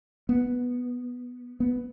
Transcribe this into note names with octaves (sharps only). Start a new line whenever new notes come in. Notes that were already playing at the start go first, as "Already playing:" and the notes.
B3
B3